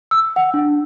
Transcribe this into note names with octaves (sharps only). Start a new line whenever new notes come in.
E6
F#5
D4